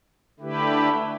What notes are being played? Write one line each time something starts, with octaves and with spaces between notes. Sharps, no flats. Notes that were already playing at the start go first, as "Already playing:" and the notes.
D3 A3 E4 G4 B4